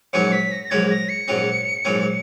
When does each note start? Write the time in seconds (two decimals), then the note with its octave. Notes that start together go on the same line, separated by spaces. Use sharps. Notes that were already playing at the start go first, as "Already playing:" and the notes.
0.13 A#1 G#2 F#3 C#4 C#7
0.32 B6
0.52 A#6
0.65 A#6
0.71 A#1 G#2 F#3 C#4 G#6
0.90 A#6
1.09 C#7
1.28 A#1 G#2 F#3 C#4
1.85 A#1 G#2 F#3 C#4